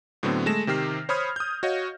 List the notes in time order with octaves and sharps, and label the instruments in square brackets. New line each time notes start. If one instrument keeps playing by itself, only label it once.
[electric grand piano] A2 D3 F#3 B3 C4
G#3 A3 A#6 E7
C3 D#3 G4 F6 C7
C5 C#5 B5 D#6 F6 G#6
D#6 G6
F#4 C#5 D#5 F5